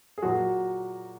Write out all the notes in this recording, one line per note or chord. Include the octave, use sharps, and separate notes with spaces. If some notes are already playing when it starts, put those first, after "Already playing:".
G#4
A#2 F#3 F#4